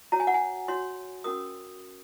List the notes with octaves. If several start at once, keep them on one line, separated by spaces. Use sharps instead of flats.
F#4 C#5 A#5
G#5
F#5
G#5
F#4 C#5 C6
C#4 F#4 A#4 D#6